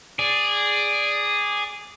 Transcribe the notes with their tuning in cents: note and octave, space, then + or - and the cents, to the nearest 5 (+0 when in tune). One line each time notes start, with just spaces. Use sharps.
G#4 -10 D5 +0